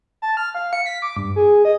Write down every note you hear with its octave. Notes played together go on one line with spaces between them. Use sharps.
A5
F6
F5
C#7
B6
D6
G2
G#4
D#5